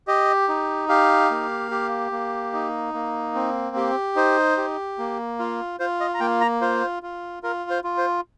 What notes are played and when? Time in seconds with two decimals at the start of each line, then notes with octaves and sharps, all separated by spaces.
0.07 G4 D#5
0.49 D#4
0.89 G4 F5
1.31 A#3
1.71 G4
2.12 A#3
2.53 D#4
2.94 A#3
3.35 C4
3.76 G4
4.16 D#4 C5
4.57 G4
4.98 A#3
5.39 F4
5.80 F4 C5
6.01 D#5
6.14 A#5
6.20 A#3 G5
6.41 A#5
6.61 F4 C5
7.03 F4
7.43 F4 A#4
7.70 C5
7.84 F4
7.98 C5